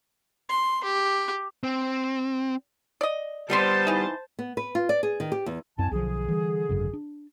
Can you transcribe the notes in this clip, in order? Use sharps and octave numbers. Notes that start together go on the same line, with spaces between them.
C6
G4
C4
D5 D#5
G3 B3 C5 A5 C6
E3 D#4
B3
B4
F4
D5
G#4
D#3
G4
E2
C2 F#2 C4 G#5 A5
B1 D3 F3 G#4
E3 G3
G#1 F#2 C#3
D4